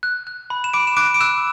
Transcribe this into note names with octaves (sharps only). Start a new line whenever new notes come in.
F#6
F#6
B5
E7
B5 D6 D7
E7
D6 F#6 D7
D7
E6 F#6 E7